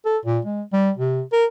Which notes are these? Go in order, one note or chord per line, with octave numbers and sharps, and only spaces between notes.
A4
A#2
G#3
G3
C3
A#4